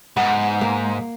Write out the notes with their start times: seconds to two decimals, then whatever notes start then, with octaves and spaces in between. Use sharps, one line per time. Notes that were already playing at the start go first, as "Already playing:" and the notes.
0.16 G#2 B3
0.61 A#3